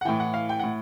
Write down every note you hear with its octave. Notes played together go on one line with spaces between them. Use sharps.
F#5
A2 E3 G5
F#5
F5
G5
A2 F#5